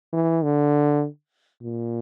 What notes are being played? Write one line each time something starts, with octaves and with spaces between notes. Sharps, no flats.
E3
D3
A#2